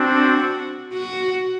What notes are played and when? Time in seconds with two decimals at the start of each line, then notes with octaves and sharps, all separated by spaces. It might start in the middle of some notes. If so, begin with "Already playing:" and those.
Already playing: C4 D4 F#4
0.93 F#4